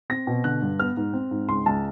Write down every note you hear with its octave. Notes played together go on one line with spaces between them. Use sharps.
C4 A#6
B2
D3 F#6
G2
B3 F6
G#2
C4
G#2
C#2 C6
C#2 A5